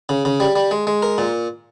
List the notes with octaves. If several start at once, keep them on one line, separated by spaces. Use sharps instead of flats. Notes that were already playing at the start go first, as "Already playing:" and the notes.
C#3
C#3
G3
G3
G#3
G#3
A#4
A#2